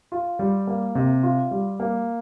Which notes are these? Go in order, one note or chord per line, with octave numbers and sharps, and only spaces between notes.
F4
G3
A#3
C3
F4
G3
A#3